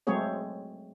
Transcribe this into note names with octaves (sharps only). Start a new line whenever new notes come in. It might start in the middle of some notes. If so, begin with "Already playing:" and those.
F#3 G#3 A3 C4 G#4 C#5